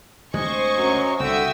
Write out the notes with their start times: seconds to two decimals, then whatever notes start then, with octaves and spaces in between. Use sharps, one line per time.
0.34 D2 C3 G#3 C5 D#5 G#5 C#6
0.76 F#2 F#3
1.20 C2 D3 F#4 E5 G5 D#6 E6